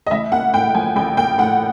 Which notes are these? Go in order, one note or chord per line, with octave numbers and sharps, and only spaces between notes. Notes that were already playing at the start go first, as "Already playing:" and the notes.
D#5
A1 E5
A#3 F#5
A2 G5
F3 G#5
A1 G5
A#3 G5
A2 F#5